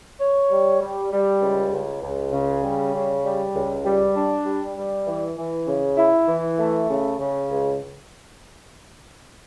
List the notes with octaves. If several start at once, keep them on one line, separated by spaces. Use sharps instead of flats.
C#5
G3
G3
G3
C#2
C#2
C#2
C#3
G3
C#3
G3
C#2
G3
D4
G3
G3
E3
E3
C#3
E4
E3
A3
C#3
C#3
C#2